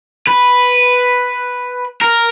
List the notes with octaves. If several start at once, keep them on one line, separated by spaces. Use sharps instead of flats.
B4
A#4